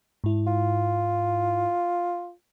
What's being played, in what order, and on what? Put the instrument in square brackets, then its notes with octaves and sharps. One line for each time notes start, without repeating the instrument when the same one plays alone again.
[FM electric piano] G#2 E4
[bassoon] F4